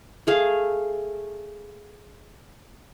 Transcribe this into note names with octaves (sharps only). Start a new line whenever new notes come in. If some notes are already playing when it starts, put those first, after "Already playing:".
A3 G#4 F5